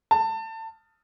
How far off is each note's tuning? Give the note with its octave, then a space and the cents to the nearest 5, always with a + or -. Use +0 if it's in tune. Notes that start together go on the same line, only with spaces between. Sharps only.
A5 +25